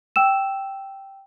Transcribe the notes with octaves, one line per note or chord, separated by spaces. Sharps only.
G5 E6 E7